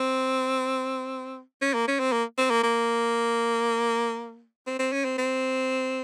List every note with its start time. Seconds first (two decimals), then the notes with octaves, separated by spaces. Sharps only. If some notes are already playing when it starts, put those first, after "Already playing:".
Already playing: C4
1.61 C#4
1.74 A#3
1.87 C#4
1.99 C4
2.12 A#3
2.38 C4
2.50 A#3
2.63 A#3
4.66 C4
4.79 C4
4.92 C#4
5.04 C4
5.18 C4